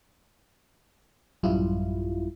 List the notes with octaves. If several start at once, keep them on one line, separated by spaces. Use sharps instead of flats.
A1 F#2 G3 E4 F4